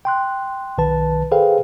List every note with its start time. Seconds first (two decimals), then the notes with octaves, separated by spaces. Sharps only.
0.05 G5 C6 F#6
0.78 B1 D#3 B4 A5
1.31 G#4 A4 B4 C5 F5 G5